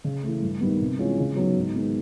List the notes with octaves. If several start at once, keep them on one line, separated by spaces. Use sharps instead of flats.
C#3
E3 A3
G2
D#3 G3 B3
C3
E3 G#3 C#4 F4
C#3
F#3 B3 D#4
G#2
D#3 G#3 B3